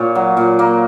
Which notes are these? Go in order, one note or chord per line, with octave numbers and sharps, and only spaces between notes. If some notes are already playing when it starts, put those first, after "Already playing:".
Already playing: A#2 C#5
F#3
A#2
A#3